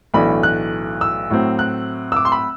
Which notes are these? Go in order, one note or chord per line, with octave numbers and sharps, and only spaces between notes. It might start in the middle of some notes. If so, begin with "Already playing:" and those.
B1 A2 E3 A3 D4 B5
F#6
E6
A2 F#3 C4
F#6
E6
D6
C6
B5